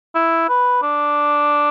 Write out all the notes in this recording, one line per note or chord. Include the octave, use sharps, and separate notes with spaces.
E4
B4
D4